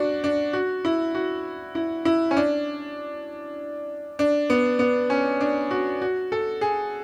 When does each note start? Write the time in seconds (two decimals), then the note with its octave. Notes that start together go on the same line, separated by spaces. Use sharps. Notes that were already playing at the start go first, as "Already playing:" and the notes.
Already playing: D4 F#4
0.24 D4
0.53 F#4
0.85 E4
1.15 F#4
1.75 E4
2.05 E4
2.31 C#4
2.37 D4
4.19 D4
4.50 B3
4.79 B3
5.10 C#4
5.41 D4
5.71 F#4
6.02 F#4
6.32 A4
6.61 G#4